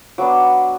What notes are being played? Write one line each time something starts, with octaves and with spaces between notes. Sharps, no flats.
F#3 B3 D4 D6